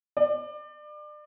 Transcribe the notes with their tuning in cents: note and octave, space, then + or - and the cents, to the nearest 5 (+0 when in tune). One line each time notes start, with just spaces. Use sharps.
D5 +30